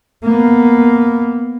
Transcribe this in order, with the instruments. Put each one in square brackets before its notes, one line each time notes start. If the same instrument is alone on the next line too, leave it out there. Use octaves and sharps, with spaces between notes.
[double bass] A#3 B3